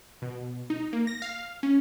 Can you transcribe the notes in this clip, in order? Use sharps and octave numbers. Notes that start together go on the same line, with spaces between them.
B2
D#4
A#3
A#6
F5
C#4